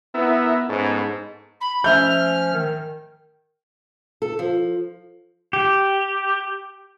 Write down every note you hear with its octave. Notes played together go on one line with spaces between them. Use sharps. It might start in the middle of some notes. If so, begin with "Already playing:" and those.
B3 E4 A#4 E5
G#2 B3 C#4 A4
B5
F3 A3 C#4 E5 F6 G6
D#3
A4
F3
G4